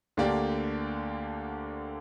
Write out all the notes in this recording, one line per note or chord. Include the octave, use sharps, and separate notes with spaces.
D2 D3 A#3 G4 D5